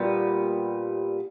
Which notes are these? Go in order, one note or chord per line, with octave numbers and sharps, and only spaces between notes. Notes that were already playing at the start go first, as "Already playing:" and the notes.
Already playing: A#2 G3 B3